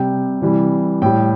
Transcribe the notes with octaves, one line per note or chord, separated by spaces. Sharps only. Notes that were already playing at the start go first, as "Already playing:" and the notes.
Already playing: C3 G3 G5
C3 E3 G3
A2 G3 G5